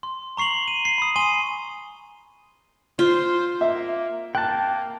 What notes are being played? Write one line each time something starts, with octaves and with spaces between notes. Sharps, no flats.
C6
A#5 C#6 C7 F7 F#7
D#7
C7
B5 D#6
G#5 C6 D#7 G7
F4 C5
A#3 E5
A#3 G5 A5 F#6